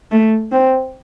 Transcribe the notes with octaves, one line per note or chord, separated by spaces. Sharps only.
A3
C4